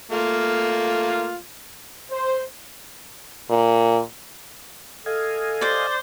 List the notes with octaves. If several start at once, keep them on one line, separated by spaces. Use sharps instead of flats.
A3 A#3 F4
C5
A#2
A4 D#5 F5 G#5
C5 D5 D6